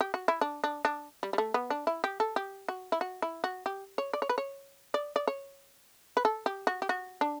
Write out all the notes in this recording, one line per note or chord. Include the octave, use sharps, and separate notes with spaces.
G4
F#4
E4
D4
D4
D4
G3
G3
A3
B3
D4
E4
G4
A4
G4
F#4
E4
F#4
E4
F#4
G4
C#5
D5
C#5
B4
C#5
D5
D5
C#5
B4
A4
G4
F#4
G4
F#4
D4